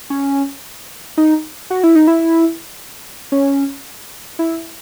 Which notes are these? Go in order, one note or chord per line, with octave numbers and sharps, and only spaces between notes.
C#4
D#4
F#4
E4
D#4
E4
C#4
E4